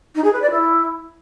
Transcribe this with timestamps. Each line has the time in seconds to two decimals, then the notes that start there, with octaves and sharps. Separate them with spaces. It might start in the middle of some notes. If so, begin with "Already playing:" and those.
0.15 D#4
0.24 G#4
0.33 B4
0.42 D5
0.51 E4